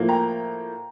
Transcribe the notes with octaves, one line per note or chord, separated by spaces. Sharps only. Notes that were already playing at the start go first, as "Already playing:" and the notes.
Already playing: A2 F3 A#3
G5 A#5